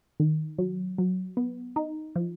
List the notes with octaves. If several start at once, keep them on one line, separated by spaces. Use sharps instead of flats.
D#3
F#3
F#3
B3
D#4
F3